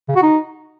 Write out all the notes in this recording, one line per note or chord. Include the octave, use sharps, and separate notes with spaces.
C#3
F#4
D#4